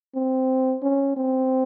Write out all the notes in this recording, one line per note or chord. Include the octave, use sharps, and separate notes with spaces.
C4
C#4
C4